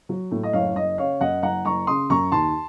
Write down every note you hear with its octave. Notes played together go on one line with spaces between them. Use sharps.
F#3
A2
D#5
F#1 C#5 F5
F#1 D#5
C#3 C#5 F5
F#2 D#5 F#5
F#1 F#5 A#5
F#1 A#5 C#6
C#3 C6 D#6
F#2 A#5 C#6
D#2 A5 C6